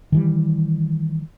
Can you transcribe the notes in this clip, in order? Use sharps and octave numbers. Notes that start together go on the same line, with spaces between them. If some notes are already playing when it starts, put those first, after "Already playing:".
D#3 E3 G3